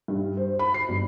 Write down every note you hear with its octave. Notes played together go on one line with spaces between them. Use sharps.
G2
C5
B5
C7
G1